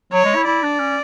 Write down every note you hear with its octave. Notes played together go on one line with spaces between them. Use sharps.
F#3 C#5
G#3
E4
E4 D5
D4
C#4